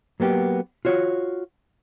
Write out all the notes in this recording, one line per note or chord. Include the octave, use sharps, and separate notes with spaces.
F#3 A#3 B3 G4
F4 F#4 C#5